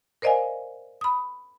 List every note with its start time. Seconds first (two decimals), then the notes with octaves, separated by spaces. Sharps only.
0.22 A#4 C5 D5 D#5 F5 G#5
1.01 B5 D#6